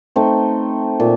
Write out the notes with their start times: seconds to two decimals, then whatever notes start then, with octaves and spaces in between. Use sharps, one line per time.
0.16 A3 C4 D#4
1.00 A#2